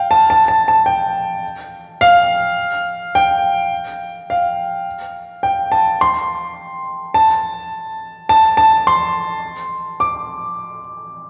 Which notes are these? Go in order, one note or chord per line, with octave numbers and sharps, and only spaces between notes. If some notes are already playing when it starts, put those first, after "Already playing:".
Already playing: F5 G5
A5
A5
A5
A5
G5
F5
G5
F5
G5
A5
C6
A5
A5
A5
C6
D6